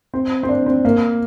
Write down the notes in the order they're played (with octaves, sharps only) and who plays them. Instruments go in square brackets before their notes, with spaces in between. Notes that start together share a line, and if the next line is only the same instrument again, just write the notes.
[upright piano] C4
C4
D4
C4
A#3